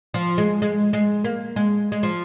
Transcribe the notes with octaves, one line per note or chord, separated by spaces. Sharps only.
F3
G#3
G#3
G#3
A#3
G#3
G#3
F3